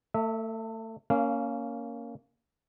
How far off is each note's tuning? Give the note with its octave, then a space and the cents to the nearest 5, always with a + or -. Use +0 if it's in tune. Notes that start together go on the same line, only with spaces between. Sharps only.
A3 +30 E5 -20
A#3 +0 C#4 +15 F5 -20